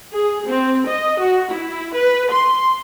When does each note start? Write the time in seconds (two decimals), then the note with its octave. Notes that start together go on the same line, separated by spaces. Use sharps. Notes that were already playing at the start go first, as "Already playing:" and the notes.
0.12 G#4
0.47 C4
0.87 D#5
1.20 F#4
1.52 E4
1.95 B4
2.31 C6